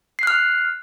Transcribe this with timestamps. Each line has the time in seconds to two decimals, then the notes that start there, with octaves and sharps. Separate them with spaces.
0.19 C7
0.23 F#6
0.27 F6